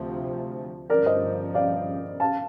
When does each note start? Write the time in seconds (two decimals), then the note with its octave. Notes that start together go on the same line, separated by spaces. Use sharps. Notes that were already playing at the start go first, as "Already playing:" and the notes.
Already playing: D2 C3 F3
0.90 G1 G2 F3 A#4 D5
1.06 C5 D#5
1.54 D5 F5
2.20 F5 A5